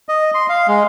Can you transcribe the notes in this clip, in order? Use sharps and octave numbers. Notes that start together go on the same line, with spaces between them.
D#5
C6
F5
G#3